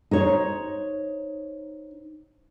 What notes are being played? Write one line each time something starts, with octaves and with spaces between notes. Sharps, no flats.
D#4 C5 C#5